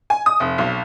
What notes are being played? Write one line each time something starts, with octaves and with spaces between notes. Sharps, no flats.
G#5
D#6
F1
B1